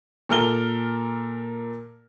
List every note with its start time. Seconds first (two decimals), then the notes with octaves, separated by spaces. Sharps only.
0.29 A#2 A4 A#4 F6 G7